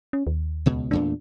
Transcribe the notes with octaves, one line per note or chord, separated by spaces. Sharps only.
C#4
D#2
C#2 B2
E2 A#2 A3 D4